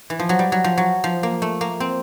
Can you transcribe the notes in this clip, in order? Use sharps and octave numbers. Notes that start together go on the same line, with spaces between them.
E3
F3
F#3
G3
F#3
F3
F#3
F3
A#3
A3
A#3
C4